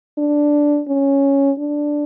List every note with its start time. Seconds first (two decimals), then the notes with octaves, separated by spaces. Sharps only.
0.18 D4
0.88 C#4
1.59 D4